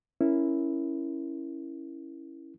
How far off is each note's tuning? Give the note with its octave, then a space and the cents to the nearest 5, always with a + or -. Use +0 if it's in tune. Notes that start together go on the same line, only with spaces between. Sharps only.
C#4 +0 E4 +0 A#4 +0